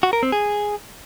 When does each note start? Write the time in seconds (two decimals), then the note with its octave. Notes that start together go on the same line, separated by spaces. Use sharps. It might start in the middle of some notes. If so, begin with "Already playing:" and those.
0.03 F#4
0.13 A#4
0.23 C4
0.32 G#4